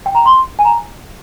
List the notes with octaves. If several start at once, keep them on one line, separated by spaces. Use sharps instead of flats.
G5
A#5
C6
G#5
A#5